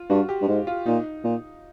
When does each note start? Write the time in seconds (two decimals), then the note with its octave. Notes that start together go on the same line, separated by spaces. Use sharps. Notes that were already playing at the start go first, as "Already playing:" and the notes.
Already playing: F4
0.09 G2 F#4
0.29 G4
0.42 G2
0.48 G#2
0.67 F4
0.86 A#2 D#4
1.24 A#2